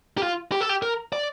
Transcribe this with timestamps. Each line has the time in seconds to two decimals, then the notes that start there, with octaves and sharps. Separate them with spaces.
0.18 G4
0.23 F4
0.52 G4
0.61 A4
0.69 G4
0.82 A#4
1.13 D5